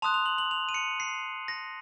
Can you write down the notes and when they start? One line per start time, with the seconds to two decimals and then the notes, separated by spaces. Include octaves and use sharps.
0.02 A5 C6 D#6 F#6 F7
0.14 F7
0.26 F#7
0.38 F#7
0.51 F7
0.69 D#7
0.74 C#7
1.00 C7
1.48 A#6